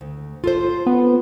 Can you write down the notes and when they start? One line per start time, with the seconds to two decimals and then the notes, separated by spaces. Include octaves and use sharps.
0.01 D2
0.44 F4 A4 C5
0.86 B3